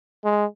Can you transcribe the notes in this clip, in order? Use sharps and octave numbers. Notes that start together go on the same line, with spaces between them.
G#3